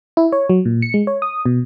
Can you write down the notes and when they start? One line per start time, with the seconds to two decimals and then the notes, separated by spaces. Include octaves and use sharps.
0.17 E4
0.32 C#5
0.49 F#3
0.65 A#2
0.82 C#7
0.94 G#3
1.07 C#5
1.22 D#6
1.46 B2